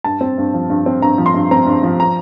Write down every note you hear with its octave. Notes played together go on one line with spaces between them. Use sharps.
G2 A5
C4
G2
F3
G2
C4
G2 A#5
F3
C6
G2
C4 A#5
G2
F3
A#5